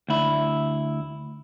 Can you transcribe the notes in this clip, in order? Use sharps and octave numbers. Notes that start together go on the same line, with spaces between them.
D2 E4